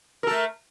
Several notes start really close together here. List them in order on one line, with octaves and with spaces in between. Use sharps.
A#4 A4 A3